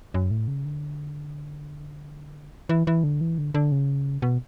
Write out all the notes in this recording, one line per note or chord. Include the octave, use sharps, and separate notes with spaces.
F#2
A2
C#3
D3
E3
E3
D3
E3
D3
D3
C#3
B2